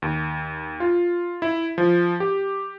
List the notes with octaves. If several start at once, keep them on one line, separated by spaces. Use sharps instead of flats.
D#2
F4
E4
F3
G4